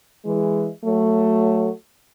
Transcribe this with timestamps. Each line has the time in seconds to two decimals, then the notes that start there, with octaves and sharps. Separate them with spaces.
0.25 E3 G#3
0.84 F#3 A3